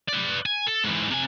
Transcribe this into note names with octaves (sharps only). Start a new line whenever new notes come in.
B4 D5
G#5
A4
G#2 E3
C3 G#5